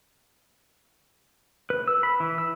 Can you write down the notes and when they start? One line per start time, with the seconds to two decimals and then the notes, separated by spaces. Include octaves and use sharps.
1.70 B4
1.88 E6
2.03 B5
2.20 E3
2.38 E6